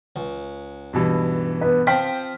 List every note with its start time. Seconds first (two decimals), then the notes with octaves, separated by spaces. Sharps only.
0.16 C#2
0.93 G2 B2 E3
1.61 B3
1.87 F3 C4 G5 F6 B6